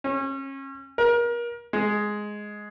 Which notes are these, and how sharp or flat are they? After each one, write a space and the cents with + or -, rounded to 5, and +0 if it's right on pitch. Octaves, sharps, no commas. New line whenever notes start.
C#4 -30
A#4 +30
G#3 +5